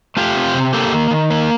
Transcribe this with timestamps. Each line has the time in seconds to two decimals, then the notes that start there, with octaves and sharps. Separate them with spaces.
0.17 A3 F4 G4
0.36 C4
0.54 C3
0.73 A#3 G4 A4
0.92 D#3
1.11 D#3
1.31 A#3